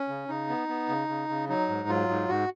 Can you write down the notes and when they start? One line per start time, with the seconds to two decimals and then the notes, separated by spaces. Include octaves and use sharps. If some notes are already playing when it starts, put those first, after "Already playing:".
Already playing: C#4
0.08 C#3
0.28 C#3 D#4
0.49 B3
0.68 B3
0.89 C#3
1.09 C#3
1.29 C#3
1.49 F#3 D#4
1.69 G#2
1.89 F#3 F4
2.08 G#2
2.28 G#2 F#4